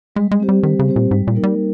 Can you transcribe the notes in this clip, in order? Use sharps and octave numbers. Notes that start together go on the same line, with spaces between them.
G3 G#3
G#3
C4 G4 C5
G3
D#3 G3
C#3
C4 G4 C5
A#2
G#2 G3
A#2
A#3 D#4 A#4
G3